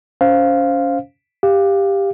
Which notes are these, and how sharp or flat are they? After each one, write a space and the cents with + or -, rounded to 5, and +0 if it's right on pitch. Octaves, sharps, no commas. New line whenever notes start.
C#4 +20 C5 +0 F5 +0
G4 +10 F5 +0